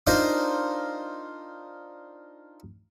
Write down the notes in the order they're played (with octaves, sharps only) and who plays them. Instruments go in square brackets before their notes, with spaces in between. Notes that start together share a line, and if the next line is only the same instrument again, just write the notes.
[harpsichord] D4 D#4 F4 A#4 C5 D#5